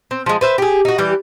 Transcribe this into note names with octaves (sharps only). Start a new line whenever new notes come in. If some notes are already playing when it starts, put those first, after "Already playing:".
C4
F3 G#3
B4 C5 E5
G4 G#4
D#4 F#4
E3 G3 G4